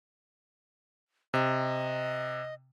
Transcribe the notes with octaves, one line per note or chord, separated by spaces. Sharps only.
C3 D#5